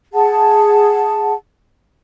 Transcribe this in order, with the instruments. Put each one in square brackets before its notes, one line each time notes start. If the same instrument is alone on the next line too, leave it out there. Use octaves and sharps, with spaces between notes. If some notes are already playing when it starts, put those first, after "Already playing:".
[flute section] G#4 F#5 A5